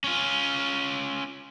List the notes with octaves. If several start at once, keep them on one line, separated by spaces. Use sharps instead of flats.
C#4 F4